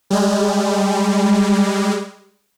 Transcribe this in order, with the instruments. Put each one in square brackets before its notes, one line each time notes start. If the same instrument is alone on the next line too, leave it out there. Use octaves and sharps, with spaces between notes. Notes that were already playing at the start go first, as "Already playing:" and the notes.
[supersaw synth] G3 G#3